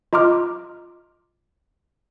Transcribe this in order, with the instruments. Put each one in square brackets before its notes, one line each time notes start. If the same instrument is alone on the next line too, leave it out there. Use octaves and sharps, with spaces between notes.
[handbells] F4 D#5 A#5 C6 D6 F6